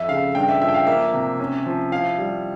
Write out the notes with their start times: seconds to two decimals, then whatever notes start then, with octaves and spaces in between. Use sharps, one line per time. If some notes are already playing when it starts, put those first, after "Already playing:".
Already playing: F2 E5
0.08 C#3 F5
0.35 G2 G5
0.49 E5
0.61 F3 E5
0.69 G5
0.74 F5
0.87 A#3 E5
1.14 C3
1.39 C#4
1.66 F3
1.92 E4 F5
2.18 G3